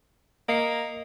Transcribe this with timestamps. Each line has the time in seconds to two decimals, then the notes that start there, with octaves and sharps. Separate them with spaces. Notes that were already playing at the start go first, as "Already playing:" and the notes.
0.49 A#3 D#5 C7 C#7